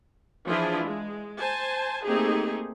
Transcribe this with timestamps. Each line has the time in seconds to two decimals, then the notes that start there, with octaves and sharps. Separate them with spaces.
0.46 E3 F3 D4 E4 F4 G#4
0.86 G#3
1.40 C5 G#5 A5
2.05 A3 A#3 C4 D#4 G4 G#4